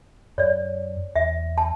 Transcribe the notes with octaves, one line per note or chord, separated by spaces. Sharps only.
F#2 C#5 D5
E2 E5
A5